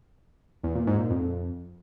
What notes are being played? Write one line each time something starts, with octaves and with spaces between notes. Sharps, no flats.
E2
A#2
G#2
A#2
F2